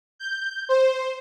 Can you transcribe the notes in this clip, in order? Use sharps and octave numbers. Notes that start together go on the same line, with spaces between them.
G6
C5